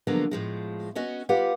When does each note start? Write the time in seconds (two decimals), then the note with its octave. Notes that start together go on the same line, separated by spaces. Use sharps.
0.07 D3 F3 F#3 G#3 A#3 B3
0.31 A2 F3 G#3
0.95 B3 C#4 F#4 D#5
1.29 F4 G4 B4 F5 F#5